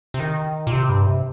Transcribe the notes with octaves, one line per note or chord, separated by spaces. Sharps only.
C3
D#3
A#2
C3
G2
C3